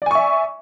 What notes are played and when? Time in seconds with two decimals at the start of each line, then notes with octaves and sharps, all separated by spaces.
0.02 D5
0.06 G#5
0.11 C#6
0.15 E5